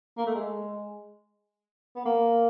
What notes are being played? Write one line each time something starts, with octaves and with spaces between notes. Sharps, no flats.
A#3
A3
G#3
B3
A#3